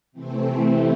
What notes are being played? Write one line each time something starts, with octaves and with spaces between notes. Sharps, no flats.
C3 E3 A3 C4